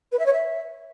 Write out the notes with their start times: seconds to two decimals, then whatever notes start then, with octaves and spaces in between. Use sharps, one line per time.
0.12 B4
0.19 E5
0.26 C#5
0.32 E5